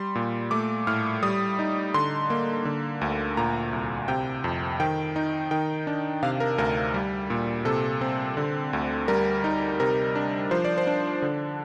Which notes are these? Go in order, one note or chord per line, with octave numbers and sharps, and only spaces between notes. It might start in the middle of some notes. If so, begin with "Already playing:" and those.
Already playing: G3 C6
A#2
A3 D6
A2 F6
G3 D#6
D#4
D3 C6
A#3
D3
D2
A#2 A#5
C2
C3 G5
F2
D#3 G5
D#4
D#3 G5
D4
C3 F5
A#4
D2 A#4
G3
A#2
C3 A4
C4
D3
D2
G3 A#4
D#4
C3 A#4
D4
F3 C5
D5
C5
D4
D3